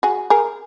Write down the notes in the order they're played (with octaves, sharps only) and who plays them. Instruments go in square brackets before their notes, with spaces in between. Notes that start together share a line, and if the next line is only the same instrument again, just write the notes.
[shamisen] F#4 G#4
G#4 A#4